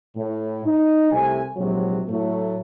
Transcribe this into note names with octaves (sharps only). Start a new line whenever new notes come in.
A2
D#4
C2 C3 A3 G#5
A#1 G#2 C3 F#3
A2 F#3 A3